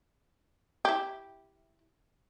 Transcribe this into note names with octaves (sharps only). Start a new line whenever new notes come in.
E4 G4